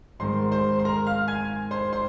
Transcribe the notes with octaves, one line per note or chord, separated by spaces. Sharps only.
G#2 D#3 G#3 C4 C5 C6
C5 C6
C6
A#4 A#5
F5 F6
G#5 G#6
C5 C6
C5 C6